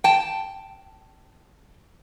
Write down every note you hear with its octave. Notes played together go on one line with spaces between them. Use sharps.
G5 A5